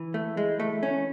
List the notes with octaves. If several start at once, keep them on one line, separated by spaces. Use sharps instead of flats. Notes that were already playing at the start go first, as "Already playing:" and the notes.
Already playing: E3
A3
G#3
A3
C#4